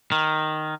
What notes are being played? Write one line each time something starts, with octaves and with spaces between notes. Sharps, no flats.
D#3